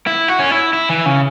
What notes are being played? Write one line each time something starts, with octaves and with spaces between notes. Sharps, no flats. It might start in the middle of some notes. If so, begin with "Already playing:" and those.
E4
F#4
C#4
E4
E4
E3
C#3